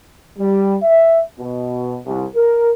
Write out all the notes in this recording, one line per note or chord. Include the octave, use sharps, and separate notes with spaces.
G3
E5
B2
C2
A#4